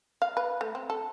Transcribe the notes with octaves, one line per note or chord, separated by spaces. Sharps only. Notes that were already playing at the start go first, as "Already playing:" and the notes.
F5
B4
A3
C4
A4